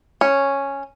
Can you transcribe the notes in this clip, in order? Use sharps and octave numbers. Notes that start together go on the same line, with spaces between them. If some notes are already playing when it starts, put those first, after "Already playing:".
C#4